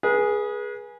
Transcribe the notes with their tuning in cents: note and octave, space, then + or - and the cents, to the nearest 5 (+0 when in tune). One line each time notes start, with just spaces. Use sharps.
G#4 +0 B4 -35